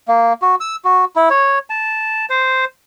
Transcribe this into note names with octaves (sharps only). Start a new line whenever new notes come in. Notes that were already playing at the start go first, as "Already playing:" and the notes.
A#3
F#4
E6
F#4
E4
C#5
A5
C5